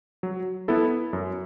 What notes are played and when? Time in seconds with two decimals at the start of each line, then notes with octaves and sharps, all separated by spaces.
0.23 F#3
0.68 B3 E4 A4
1.13 F#2